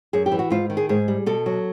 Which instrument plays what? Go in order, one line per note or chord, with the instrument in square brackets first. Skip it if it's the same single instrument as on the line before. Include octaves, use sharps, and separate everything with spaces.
[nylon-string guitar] F#2 G#4
G4
E3
F#4
G#2 F4
D#3
G#4
G#2 G#4
G3
B2 A4
F#3